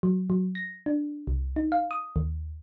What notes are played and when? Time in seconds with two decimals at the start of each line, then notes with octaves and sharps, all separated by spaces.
0.03 F#3
0.30 F#3
0.55 A#6
0.86 D4
1.27 C2
1.56 D#4
1.72 F5
1.91 D#6
2.16 D#2